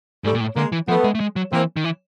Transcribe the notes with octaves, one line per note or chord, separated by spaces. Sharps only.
G#2 G3 A3
A#2
A2
D3 G#3 A#3
E3
F3 A3 B3
G#3
A3
G#3
F#3
E3 A#3 C4
D#3
E3